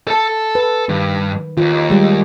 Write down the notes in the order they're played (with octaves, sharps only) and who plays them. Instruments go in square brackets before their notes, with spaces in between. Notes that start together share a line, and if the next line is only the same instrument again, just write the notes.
[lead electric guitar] A4 A5
[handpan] B4
[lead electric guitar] G2 [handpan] D#3
[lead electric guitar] D#2 [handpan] F4
[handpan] G3 G#3